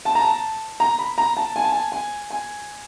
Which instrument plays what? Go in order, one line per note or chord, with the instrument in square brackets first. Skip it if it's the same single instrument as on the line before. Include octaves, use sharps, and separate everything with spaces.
[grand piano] A5
A#5
A5
A#5
B5
A#5
A5
G#5
A5
G#5
G#5
G#5